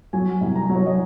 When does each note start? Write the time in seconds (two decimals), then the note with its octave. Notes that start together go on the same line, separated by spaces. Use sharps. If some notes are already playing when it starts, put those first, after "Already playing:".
0.13 F#3 G#5
0.41 C2
0.56 A#5
0.69 F#3
0.75 C#5
0.86 D#5